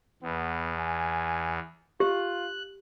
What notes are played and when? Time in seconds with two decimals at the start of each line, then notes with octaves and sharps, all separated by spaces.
0.22 E2 B3
0.78 G#5
2.00 F4 G4 F#6